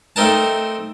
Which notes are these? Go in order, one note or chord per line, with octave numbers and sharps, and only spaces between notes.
A3 C4 D#4 A#4 A5